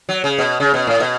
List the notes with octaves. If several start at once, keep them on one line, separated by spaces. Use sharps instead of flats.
F#3
C#3
B2
C#3
B2
A2
B2